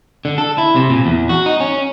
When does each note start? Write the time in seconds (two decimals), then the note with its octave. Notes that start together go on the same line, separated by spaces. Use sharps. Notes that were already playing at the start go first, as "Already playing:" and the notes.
0.25 D3
0.38 A4
0.58 E4
0.76 C3
0.90 A#2
1.06 E2
1.29 F#4
1.46 D#4
1.60 C#4